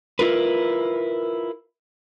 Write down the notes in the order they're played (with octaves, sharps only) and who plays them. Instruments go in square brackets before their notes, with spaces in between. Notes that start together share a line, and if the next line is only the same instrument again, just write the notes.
[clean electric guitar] E4 F4 A#4 B4